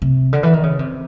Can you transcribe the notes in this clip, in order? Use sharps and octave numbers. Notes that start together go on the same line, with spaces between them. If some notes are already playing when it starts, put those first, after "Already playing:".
C3
D3
E3
D#3
C#3
C3